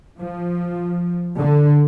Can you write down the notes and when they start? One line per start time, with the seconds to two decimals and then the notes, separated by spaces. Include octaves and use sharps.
0.18 F3
1.37 D3